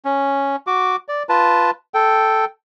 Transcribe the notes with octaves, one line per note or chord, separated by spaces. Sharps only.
C#4
F#4 D6
D5
F4 B4 A5
A4 G5